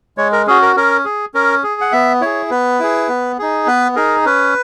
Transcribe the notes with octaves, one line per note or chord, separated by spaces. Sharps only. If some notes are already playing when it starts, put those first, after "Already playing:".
G#3 C#5
A#4
C#4 F#4 G#4
A#4
C#4 A#4
G#4
C#4 A#4
G#4
F#5
B3 E5
E4 G#4 C#5
B3 B4
E4 G#4
B3
D#4 G#4
B3 B4
D#4 G#4 A#4
C#4 B4